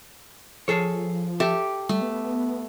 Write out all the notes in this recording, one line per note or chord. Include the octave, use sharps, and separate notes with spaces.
F3 G#4 A4 C#5
G4 A4 E5
G3 A3
B3